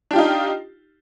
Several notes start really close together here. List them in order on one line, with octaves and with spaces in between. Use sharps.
D4 G4 F4 D#4